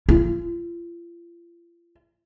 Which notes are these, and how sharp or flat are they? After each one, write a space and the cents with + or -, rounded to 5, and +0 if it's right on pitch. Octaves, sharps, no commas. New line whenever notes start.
F4 -35